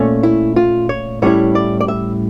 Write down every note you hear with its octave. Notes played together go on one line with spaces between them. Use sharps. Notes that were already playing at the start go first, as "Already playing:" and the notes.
Already playing: A#2 A3 C#4
E4
F4
C#5
A2 G3 C#4 E4 C#5
D5
D5
E5